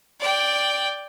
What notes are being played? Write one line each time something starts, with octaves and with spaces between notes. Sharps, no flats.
D5 G5